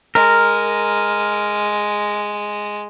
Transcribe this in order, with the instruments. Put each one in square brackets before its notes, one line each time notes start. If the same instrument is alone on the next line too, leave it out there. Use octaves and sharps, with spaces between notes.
[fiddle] G#3 [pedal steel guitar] A#4